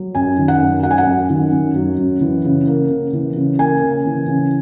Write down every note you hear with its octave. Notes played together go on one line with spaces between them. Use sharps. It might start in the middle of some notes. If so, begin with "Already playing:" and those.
Already playing: F#3
F#2 G#5
D#3
F#5
F#2
F#3 F#5
G#5
F#5
F#2
D#3
F#2
F#3
F#2
E3
C#3
A#3
C#3
E3
C#3
A#3 G#5
C#3
E3
C#3